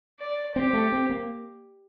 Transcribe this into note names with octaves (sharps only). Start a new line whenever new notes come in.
D5
C4 G4
A3
C4
A#3